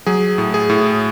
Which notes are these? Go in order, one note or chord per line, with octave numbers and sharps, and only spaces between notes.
F#3 G#4
A2
G#4
A2